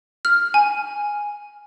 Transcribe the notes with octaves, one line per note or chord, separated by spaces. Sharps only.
F6
G#5